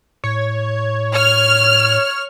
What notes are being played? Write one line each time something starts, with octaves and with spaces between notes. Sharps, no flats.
A2 C#5
C#5 F6